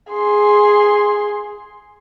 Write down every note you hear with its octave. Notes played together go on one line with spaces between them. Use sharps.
G#4 C6